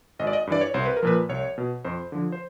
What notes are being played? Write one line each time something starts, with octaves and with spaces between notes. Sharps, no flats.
G#1 D#5
D5
D#5
G2 E3 D5
C#5
C2 C5
B4
A#4
A#2 F3 B4
C2 C#5
B2
F2 C5
D3 F3
C5